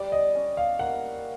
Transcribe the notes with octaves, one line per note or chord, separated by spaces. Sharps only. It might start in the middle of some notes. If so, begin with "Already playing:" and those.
Already playing: G3 D5
D#5
C#4
F5
A#3 F#5